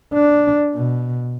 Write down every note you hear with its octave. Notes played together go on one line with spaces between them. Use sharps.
D4
B2